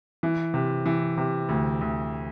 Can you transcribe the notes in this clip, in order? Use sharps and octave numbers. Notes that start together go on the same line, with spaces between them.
E3
C3
E3
C3
D2
D2